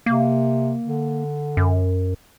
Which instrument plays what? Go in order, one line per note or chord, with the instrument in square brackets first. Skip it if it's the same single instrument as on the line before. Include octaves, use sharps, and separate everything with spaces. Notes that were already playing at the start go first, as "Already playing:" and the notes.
[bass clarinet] C3 [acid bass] A#3
[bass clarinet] D3
[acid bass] F#2